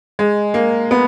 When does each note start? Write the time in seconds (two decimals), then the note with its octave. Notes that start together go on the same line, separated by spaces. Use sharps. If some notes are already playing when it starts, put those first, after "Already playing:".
0.19 G#3
0.54 A#3
0.91 B3